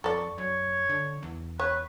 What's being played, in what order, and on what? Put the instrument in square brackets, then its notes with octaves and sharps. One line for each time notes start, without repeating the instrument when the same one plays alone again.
[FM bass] F2 [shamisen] A4 D5 [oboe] C#6
[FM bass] F#2 [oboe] C#5
[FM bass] D3
E2
[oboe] B4 [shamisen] C#5